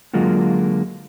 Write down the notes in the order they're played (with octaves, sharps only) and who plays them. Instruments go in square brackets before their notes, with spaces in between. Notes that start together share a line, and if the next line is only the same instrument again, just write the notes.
[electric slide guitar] D3 F#3 G#3 A#3 F4 F#4